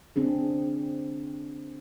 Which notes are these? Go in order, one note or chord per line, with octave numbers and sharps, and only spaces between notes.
D3 C4 D4 G#4